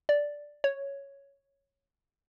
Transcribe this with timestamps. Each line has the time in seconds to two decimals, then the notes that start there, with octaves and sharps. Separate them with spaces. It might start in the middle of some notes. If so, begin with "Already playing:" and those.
0.09 D5
0.64 C#5